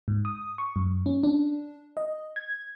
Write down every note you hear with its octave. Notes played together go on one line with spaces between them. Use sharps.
G#2
D#6
C#6
F#2
C#4
D4
D#5
G#6